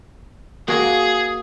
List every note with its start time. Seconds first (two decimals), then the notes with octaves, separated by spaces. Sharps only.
0.68 A#3 F#4 G#4